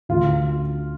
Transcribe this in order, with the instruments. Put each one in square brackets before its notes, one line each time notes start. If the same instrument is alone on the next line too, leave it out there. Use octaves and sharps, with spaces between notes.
[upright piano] D2 F4